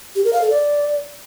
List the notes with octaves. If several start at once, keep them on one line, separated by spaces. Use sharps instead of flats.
G4
A#4
F5
A4
D5